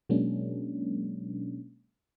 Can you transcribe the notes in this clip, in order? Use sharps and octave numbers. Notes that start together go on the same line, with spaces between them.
B2 F#3 G#3 A#3 C#4 D4